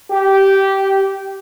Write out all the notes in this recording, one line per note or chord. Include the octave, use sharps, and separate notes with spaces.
G4